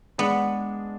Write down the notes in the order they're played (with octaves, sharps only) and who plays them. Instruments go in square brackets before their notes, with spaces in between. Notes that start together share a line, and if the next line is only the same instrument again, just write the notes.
[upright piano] G#3 D4 G#4 [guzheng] B3